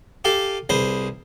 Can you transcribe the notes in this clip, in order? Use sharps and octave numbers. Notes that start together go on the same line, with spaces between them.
G4 A4 F5 G#5
C2 G#4 B4 C5